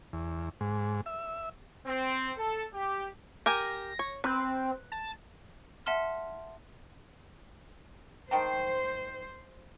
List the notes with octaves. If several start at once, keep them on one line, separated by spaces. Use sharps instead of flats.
E2
G#2
E5
C4
A4
G4
G4 A#4 G#5 A#6
C#5
C4 B4
A5
E5 F#5 A5 C6 F6
D#3 C5 G5 A5